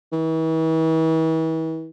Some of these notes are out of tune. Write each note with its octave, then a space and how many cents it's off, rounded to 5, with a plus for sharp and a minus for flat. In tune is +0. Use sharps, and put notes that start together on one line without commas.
E3 -40